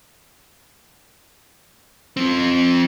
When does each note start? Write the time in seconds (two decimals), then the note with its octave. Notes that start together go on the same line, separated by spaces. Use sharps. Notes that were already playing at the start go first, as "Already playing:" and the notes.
2.17 F3 C4